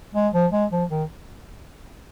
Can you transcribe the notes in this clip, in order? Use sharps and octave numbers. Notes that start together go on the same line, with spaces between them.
G#3
F3
G#3
F3
D#3